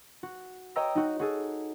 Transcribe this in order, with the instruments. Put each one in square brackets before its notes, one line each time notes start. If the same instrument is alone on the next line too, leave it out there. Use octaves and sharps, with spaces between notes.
[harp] F#4
C#5 D#5 G5 A#5 E6 A#6
D#4 F#4
F#4 G#4 A4